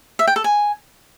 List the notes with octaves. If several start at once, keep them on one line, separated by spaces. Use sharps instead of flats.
E5
G5
A4
G#5